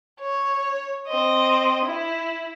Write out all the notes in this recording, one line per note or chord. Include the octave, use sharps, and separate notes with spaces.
C#5
C4 D#5
E4